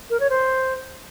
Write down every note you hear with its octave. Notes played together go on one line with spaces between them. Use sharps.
A#4
C#5
C5